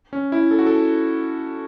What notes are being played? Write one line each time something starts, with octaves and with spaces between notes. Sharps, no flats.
C#4
E4
A4
F#4
A4